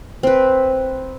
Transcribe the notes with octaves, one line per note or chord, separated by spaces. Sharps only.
C4 B4